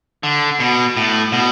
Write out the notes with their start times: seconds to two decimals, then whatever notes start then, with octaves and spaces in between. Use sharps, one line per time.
0.23 D3
0.60 B2
0.96 A2
1.32 B2